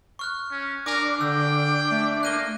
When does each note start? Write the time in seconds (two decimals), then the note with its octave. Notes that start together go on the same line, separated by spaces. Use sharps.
0.19 C#6 F6 F#6
0.51 C#4
0.86 D4 A#4 G#5 D6
1.21 D3 G5 E6
1.92 A3
2.23 A#3 F#6 D#7 G7